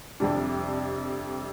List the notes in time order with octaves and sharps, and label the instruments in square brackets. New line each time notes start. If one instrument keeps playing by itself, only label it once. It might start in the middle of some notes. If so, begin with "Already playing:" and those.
[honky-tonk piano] F2 C3 G3 D4